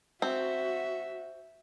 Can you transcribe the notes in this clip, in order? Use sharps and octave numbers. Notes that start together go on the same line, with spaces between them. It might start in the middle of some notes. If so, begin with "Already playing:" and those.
C4 F#4 E5